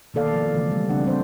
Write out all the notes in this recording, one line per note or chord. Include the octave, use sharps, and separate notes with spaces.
B2 D#3 A#3 A4 D5 F5
F3
C#3 E3 A3
G3
C#3 C4 D4 F#5
G3 C4 C5